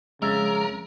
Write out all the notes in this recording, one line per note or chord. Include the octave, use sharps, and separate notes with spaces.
F2 C#3 G#3 A#4 E5